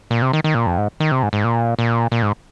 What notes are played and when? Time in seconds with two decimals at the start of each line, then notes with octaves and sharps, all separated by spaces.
0.11 A#2
0.22 C3
0.33 D#3
0.44 D#3
0.55 A#2
0.67 F2
0.78 G#2
1.00 D#3
1.12 C3
1.23 G#2
1.33 G#2
1.44 A#2
1.79 A#2
2.12 A#2
2.22 G#2